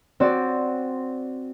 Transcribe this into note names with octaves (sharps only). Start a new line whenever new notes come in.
C4 F#4 D5